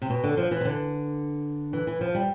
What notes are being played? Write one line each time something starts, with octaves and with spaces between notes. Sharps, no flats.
C3
B2
D3
F3
E3
C3
D3
E3
E3
F3
G3